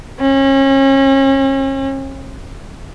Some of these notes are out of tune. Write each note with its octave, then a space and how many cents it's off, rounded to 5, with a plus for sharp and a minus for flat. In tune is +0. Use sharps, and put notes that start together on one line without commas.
C#4 -35